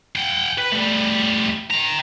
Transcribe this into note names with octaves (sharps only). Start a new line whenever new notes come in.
F#5 G5
B4
G3 A3
G5 A#5